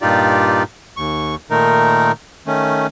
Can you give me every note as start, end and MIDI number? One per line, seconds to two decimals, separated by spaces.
0.02 0.63 43
0.02 0.63 46
0.02 0.63 63
0.02 0.63 65
0.02 0.63 67
0.02 0.63 74
0.97 1.35 39
0.97 1.35 85
1.51 2.12 46
1.51 2.12 51
1.51 2.12 57
1.51 2.12 63
1.51 2.12 70
2.47 2.87 51
2.47 2.87 57
2.47 2.87 61